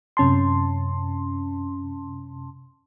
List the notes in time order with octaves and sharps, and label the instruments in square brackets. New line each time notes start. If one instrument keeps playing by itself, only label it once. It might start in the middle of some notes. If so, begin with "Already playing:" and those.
[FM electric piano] F#2 C3 C#4 A5 C6